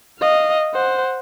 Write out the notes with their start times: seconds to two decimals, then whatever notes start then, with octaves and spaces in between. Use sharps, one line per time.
0.19 D#5 F5
0.74 C5 F#5